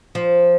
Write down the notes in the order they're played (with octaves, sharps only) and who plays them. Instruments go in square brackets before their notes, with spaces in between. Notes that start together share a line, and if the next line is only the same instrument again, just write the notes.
[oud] F3